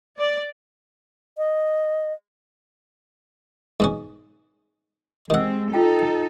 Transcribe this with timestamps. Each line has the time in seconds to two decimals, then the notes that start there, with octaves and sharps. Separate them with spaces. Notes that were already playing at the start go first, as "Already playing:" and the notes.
0.18 D5
1.38 D#5
3.80 G#2 B2 C#4
5.30 D#3 G#3 C4 G4 F#5 E6
5.74 D#4 F4 A4 G5